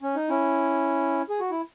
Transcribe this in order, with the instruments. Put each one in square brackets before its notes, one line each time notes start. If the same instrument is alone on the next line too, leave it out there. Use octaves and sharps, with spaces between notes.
[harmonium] C#4
D#4
C#4 E4
G#4
F#4
E4